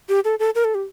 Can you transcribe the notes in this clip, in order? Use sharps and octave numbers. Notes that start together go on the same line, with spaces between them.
G4
A4
A4
A#4
A4
G4